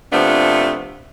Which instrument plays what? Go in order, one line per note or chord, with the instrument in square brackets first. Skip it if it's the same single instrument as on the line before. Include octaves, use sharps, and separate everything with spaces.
[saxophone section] C3 F3 A3 B3 D4